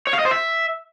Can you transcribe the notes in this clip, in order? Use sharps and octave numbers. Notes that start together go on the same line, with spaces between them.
C#5
F5
D#5
C5
E5